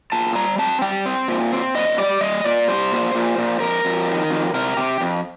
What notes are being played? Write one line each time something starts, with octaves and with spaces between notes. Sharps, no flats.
A#2 A5
G3 A#5
C4 A5
G3 G5
C4
A#2
C4
A#2 D#5
G3 D5
G3 D#5
A#2 D5
G3 C5
A#2
A#2
A#2
F2 A#4
F2
D#3
F2
C3 A#4
C3 G4
F2